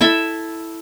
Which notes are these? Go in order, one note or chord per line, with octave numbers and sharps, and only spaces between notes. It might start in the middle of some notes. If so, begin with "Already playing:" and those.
E4 A4 E5